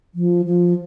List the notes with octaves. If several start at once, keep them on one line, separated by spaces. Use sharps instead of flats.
F3
F3